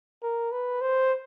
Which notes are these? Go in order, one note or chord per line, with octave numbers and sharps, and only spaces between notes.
A#4
B4
C5